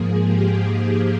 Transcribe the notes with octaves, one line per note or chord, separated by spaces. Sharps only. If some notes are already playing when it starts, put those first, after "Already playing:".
Already playing: G#2 F3 A#3 G#4
G4